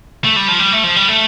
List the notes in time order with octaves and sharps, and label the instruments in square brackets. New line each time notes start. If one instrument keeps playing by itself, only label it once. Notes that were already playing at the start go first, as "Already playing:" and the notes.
[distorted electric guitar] A3
G3
F3
G3
A3
F3
G3
A3